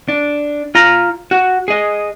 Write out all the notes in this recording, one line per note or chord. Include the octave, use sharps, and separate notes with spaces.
D4
F4 A#5
F#4
G#4 D#5